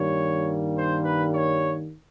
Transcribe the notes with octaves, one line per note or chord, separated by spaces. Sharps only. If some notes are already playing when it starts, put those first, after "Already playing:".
Already playing: G2 D#3 G3 A#3 C#5
C5
B4
C#5